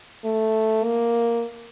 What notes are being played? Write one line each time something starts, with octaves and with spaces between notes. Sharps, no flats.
A3
A#3